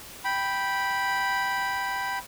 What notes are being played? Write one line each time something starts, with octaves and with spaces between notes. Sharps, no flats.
G5 B5